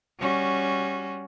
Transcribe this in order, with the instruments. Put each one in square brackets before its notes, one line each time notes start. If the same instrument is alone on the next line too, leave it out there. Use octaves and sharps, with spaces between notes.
[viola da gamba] G3 C#4 F#4